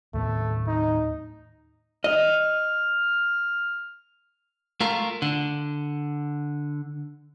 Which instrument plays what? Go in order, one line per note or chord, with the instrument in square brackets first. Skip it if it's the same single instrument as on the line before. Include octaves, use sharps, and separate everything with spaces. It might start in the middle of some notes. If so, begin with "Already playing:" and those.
[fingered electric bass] D#2 A2 B3 [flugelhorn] A3
[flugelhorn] D#4
[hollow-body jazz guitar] D#5 [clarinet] F6
[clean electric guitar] A3 F4 A#4
D3